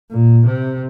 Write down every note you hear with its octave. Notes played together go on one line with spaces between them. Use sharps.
A#2
C3